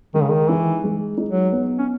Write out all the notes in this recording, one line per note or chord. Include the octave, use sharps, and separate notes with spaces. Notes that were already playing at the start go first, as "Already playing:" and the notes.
D#3 G#3
C#3
D#3
E3 D#4
G#3
D#4
F#3
B3
C#4